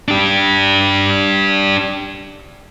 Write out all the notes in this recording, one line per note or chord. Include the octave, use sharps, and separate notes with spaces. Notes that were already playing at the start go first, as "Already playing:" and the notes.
D4 G4